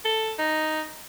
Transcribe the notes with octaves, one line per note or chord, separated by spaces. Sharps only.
A4
D#4